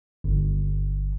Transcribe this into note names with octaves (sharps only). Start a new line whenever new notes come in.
G1